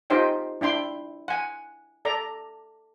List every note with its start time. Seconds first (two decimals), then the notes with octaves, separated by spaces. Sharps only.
0.10 D#4 F4 G4 C5 D#5 G5
0.61 D4 E4 G5 C6
1.28 F#5 G#5
2.05 A4 D5 A#5